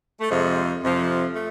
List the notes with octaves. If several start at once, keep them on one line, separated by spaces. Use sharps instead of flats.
A3
F2 C3 F3 G#3
F2 C3 F3
A3